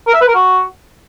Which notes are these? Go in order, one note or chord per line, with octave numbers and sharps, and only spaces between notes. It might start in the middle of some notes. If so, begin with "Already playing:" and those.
A#4
E5
B4
A#4
F#4